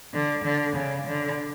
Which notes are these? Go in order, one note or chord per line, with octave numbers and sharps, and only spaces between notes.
D3
D3
C#3
D3